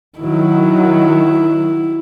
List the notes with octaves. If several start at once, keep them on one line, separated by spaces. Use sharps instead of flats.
D#3 F#3 E4